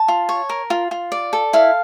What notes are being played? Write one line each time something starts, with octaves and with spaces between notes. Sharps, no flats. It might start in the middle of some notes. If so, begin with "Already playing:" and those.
Already playing: A5
F4
C#5
A#4
F4
F4
D5
A4
E4 F5